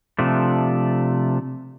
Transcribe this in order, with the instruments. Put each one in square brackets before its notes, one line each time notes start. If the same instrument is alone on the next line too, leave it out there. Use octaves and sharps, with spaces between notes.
[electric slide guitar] C3 F3 A3 D4